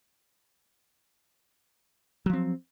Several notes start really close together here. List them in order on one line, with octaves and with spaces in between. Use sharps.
F#3 F3 C4